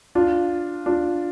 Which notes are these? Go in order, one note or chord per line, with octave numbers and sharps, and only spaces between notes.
D4 F4
D4 F4